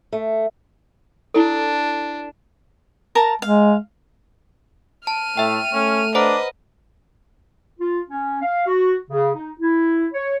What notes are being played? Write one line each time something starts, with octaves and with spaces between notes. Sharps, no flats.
A3
D4 E4 A4
A#4 A5 A#5
G#3 F5
A5 F6 D#7
A2 A3 E5 G5
A3 C#4
D4 B4 C5 D#5 F#5 A#5
F4
C#4
F5
F#4
C#3
D#4
E4
C#5